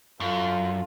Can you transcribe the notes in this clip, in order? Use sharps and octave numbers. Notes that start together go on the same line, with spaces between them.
F#2 F4 A4